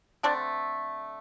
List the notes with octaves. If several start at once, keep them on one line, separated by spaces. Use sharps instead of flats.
D3 A3 C4 D4